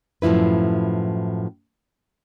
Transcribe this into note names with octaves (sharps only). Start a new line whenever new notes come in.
F#2 A2 F3 E4 B4